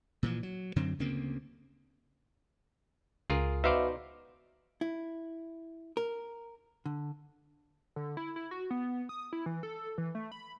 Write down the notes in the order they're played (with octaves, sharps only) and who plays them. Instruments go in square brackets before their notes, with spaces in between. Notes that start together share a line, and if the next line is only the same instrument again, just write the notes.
[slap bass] A#2 E3 F3
F#3
F#2 D3 F#3 C4
D2 C#3 A#3 C4
[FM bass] C#2 [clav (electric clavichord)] F4 G#4 A#4
[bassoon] B2 [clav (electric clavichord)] D#4 C5 D5 [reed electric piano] E5 F5 D6
[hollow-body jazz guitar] E4
A#4
D3
[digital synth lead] D3
E4
E4
F#4
B3
D#6
E4
E3
A4
E3
A3
B5